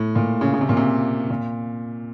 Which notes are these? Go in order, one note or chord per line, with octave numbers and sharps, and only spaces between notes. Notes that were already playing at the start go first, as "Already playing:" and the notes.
Already playing: A2
A#2
C#3
C#3
C3
A#2
C3
A#2